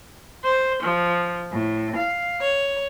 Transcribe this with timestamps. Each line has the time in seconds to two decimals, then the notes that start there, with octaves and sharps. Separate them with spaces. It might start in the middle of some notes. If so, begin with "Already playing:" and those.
0.45 C5
0.83 F3
1.52 A2
1.95 F5
2.42 C#5